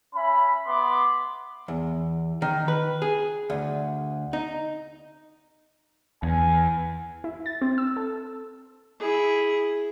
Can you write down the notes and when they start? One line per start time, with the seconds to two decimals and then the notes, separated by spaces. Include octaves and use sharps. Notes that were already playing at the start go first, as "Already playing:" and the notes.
0.14 C#4 E5 B5
0.66 B3 B5 C6 D6
1.68 E2
2.42 D#3
2.68 B4
3.02 G#4
3.50 D2
4.33 D#4
6.23 E2 G#5
7.24 E4
7.46 A6
7.62 C4
7.78 E6
7.97 A4
8.99 E4 G#4